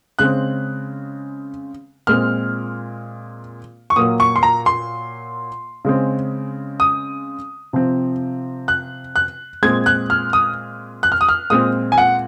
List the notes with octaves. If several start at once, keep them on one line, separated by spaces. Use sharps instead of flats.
C#3 G#3 C4 F#6
A#2 G#3 C4 F6
C#6
A#2 F#3 A#3 D#6
C#6
C6
A#5
C6
C#3 G#3 C4
D#6
C3 F3 C4
F#6
F#6
A#2 G#3 C4 G#6
F#6
F6
D#6
F#6
F6
D#6
F6
A#2 G#3 C4 D#6
G#5
F#5